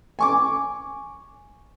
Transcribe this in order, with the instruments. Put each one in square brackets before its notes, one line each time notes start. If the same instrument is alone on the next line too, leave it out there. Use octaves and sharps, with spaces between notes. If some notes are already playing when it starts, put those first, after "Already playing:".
[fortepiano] G#5 C#6 D6